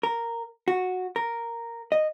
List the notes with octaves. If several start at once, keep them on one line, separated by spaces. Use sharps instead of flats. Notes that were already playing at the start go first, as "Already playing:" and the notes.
A#4
F#4
A#4
D#5